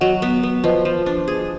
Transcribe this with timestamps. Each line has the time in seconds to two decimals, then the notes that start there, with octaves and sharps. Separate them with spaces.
0.01 F#3 D#5 F#5
0.22 B3
0.43 B3
0.64 F3 B4 D#5
0.85 F3
1.06 D4
1.28 G#4